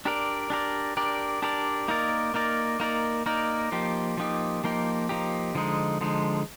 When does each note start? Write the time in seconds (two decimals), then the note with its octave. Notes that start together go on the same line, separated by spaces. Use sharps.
0.05 D4 G4 A#4 D5
0.50 D4 G4 A#4 D5
0.97 D4 G4 A#4 D5
1.42 D4 G4 A#4 D5
1.88 A#3 D#4 A#4 D5
2.34 A#3 D#4 A#4 D5
2.80 A#3 D#4 A#4 D5
3.26 A#3 D#4 A#4 D5
3.72 F3 A#3 D#4 G4
4.17 F3 A#3 D#4 G4
4.64 F3 A#3 D#4 G4
5.09 F3 A#3 D#4 G4
5.55 D3 F3 G#3 D#4
6.01 D3 F3 G#3 D#4